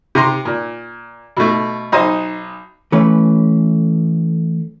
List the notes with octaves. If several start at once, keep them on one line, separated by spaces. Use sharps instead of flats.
C3 A#5 C6
A#2
B2 A3
B1 D#4 C5 D#6
E3 A3 C#4 B4